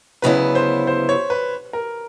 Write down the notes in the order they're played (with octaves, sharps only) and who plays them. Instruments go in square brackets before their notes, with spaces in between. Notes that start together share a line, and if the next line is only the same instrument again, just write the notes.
[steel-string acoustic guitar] D2 C#3 F#3 B3 E4 [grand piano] B4
[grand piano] C5
C5
C#5
B4
A#4